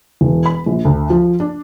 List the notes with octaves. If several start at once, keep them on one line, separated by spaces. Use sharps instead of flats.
E1
B5
A#1
D2
F3
D4